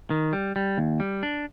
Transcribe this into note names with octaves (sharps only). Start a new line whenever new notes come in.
D#3
G3
G3
D#2
G3
D4